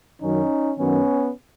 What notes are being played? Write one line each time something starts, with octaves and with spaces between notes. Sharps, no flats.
F#2 D#3 F#3 C#4 D#4
F#2 D#3 F#3 B3 C#4